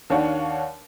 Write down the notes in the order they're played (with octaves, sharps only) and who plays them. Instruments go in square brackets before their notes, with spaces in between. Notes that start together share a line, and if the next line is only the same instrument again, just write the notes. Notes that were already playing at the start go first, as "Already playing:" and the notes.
[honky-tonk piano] D#2 D4 C#5 F5 F#5